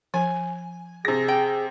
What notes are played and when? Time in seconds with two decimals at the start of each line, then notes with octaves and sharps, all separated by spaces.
0.14 F3 G#5
1.05 C3 G#4 A#6
1.28 G5